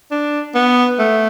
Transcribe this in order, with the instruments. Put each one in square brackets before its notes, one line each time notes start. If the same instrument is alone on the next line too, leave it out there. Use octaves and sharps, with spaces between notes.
[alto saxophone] D4
B3
A3